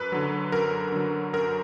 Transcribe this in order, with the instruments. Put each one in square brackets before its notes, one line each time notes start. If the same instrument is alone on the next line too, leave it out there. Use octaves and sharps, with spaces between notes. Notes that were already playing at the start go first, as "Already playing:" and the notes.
Already playing: [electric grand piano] F#2 B4
D3 F#3
F#2 A#4
D3 F#3
F#2 A#4